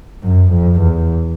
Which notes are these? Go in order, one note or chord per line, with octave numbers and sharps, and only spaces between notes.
F#2
F2
E2